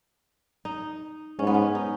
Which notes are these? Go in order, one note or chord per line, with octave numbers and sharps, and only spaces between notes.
D#4
G#2 C#4
B3
C#4
D#4